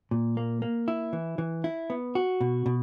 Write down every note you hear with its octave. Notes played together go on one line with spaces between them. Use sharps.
A#2
A#3
A#3
E4
E3
E3
E4
B3
F#4
B2
B2